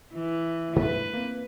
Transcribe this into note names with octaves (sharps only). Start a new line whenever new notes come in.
E3
G2 A3 B4
A#3 C4